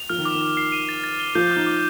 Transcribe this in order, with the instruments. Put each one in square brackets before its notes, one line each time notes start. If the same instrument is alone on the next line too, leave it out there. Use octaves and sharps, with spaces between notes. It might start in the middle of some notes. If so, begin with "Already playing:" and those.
Already playing: [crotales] F7
[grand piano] F3 [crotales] F6
[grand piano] D#3
[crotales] D6
[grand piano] D#3
[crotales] D6
C7
D#7
A6
A6
G7
[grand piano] F3 [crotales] G6
[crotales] D6
[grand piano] D#4
[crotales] D6